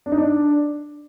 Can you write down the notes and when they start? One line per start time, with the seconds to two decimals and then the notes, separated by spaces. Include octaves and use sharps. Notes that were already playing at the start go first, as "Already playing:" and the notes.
0.06 D4
0.12 D#4
0.18 D4